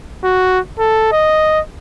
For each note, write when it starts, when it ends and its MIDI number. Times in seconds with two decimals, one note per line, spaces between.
0.24 0.59 66
0.79 1.08 69
1.12 1.60 75